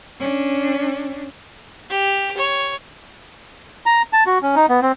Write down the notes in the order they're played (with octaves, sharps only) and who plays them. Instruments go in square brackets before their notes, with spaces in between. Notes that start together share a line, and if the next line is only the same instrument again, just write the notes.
[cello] C#4 D4
[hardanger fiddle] G4
C#5
[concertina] A#5
A5
F#4
C#4
D#4
B3
C4